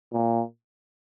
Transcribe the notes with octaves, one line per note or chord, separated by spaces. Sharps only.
A#2